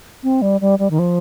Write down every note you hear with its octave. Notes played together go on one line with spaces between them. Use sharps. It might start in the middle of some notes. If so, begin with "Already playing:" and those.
C4
G3
G3
G3
D#3
F3